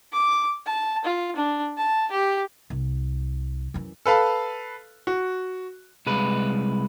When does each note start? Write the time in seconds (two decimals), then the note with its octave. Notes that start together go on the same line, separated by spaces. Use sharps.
0.13 D6
0.66 A5
1.04 F4
1.36 D4
1.77 A5
2.11 G4
2.70 C2
3.74 F#2 E3
4.06 A4 B4 F5 A5
5.07 F#4
6.06 C2 G#3 B4